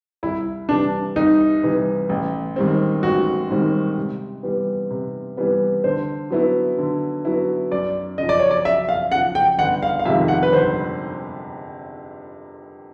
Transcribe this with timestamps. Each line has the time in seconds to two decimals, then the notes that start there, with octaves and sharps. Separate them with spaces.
0.23 C2 E4
0.69 C3 E3 G3 D4
1.16 C2 D#4
1.63 C3 E3 G3
2.09 A1
2.56 G#2 D#3 G3 C4
3.03 A1 F#4
3.50 G#2 D#3 G3 C4
3.97 C3
4.43 E3 G3 B3
4.90 C3
5.37 E3 G3 B3
5.84 D3 C5
6.31 F#3 B3 E4
6.78 D3
7.25 F#3 B3 E4
7.72 F#2 D5
8.18 C#3 F3 D#5
8.29 D5
8.39 C#5
8.51 D5
8.65 F#2 E5
8.89 F5
9.12 C#3 F3 F#5
9.35 G5
9.58 G1 F#5
9.82 F5
9.99 F5
10.05 F2 C3 D#3 G#3 E5
10.28 F#5
10.43 B4
10.52 G1 C5